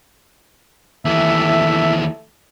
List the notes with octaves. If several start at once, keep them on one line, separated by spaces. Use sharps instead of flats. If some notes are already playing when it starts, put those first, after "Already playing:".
D#2 E3 A3 E5